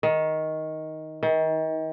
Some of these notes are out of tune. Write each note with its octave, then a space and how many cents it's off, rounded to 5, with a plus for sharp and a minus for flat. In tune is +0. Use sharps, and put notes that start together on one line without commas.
D#3 +10
D#3 +35